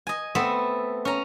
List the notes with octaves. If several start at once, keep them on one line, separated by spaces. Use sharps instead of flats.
D#5 G#5
A3 B3 C4 A4 E5
C#4 A#5